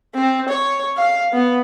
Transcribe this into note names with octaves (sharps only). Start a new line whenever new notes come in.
C4
C#5
F5
B3